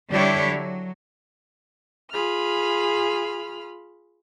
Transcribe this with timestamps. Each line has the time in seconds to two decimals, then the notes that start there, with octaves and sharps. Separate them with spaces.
0.10 D3 G3 D4 E4 G4 C#5
0.50 F#3
2.11 F4 G#4 B5 F6